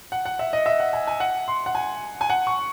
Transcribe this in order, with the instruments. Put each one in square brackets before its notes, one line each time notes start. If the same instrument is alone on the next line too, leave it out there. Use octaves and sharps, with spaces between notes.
[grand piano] F#5
F#5
E5
D#5
E5
F#5
G#5
G#5
F#5
C6
F#5
G#5
G#5
F#5
C#6